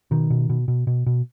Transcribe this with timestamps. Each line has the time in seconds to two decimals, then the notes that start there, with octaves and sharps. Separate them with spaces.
0.11 B2 D#3
0.30 B2
0.49 B2
0.68 B2
0.87 B2
1.06 B2